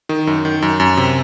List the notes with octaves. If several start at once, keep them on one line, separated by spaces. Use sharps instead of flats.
D#3
F#2
D#3
F#2
F#2
C3